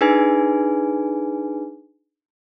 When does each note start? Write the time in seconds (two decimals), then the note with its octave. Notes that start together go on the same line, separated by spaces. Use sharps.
0.01 D4 D#4 G#4 B4 G#5